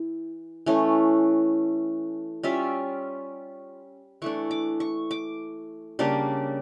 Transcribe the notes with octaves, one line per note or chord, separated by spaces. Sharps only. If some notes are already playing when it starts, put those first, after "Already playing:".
Already playing: E3 E4
E3 A3 C#4
G3 C#4 F4 E5
E3 A3 D4 C#6
D6
C#6
D6
C#3 G3 A#3 D4